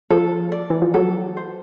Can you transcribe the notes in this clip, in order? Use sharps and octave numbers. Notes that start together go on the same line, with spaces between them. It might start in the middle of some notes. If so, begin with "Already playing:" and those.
F3 A4
D5
E3
F3
F#3 A4
C5